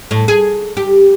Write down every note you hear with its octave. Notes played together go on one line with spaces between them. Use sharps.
A2
G#4
G4